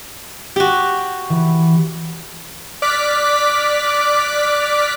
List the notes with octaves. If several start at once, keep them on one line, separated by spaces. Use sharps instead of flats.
F#4 G4
E3
D5 D6 F6 F#6 B6